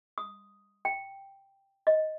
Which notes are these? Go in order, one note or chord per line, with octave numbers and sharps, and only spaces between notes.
D#6
G5
D#5